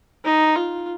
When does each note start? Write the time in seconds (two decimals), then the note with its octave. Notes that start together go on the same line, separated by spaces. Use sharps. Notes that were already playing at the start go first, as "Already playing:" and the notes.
0.24 D#4
0.55 F4